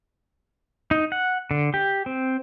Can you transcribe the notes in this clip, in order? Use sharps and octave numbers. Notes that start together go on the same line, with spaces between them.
D#4
F#5
D3
G4
C4